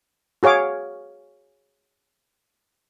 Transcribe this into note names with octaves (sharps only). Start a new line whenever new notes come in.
F#4 G#4 C#5 F5 D6